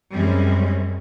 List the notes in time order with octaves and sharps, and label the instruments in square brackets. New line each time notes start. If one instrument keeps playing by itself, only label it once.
[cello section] F#2 G3 G#3 C4 C#4